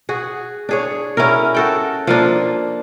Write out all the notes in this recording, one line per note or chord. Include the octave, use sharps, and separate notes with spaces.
F#4 G#4
D4 G#4 C#5
C#4 E4 F#4 A#4
F#4 A4 G5
F3 A#3 D4